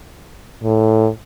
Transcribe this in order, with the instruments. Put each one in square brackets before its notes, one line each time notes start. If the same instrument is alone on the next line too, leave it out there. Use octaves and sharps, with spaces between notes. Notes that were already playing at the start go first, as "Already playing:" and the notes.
[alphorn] A2